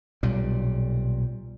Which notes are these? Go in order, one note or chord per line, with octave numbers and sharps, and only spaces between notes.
B1 A#2 G3